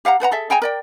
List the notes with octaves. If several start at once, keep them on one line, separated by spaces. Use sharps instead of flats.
G4 F5 F#5 A#5
A4 B4 F#5 A#5
G#4 A4 E5
G#4 G5 G#5 A#5
A#4 D5 G5